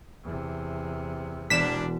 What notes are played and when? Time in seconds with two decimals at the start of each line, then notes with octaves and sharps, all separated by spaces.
0.24 E2 C3
1.50 E1 A#3 B3 D4 B6 E7